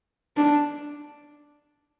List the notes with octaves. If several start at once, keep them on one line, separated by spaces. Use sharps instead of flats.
D4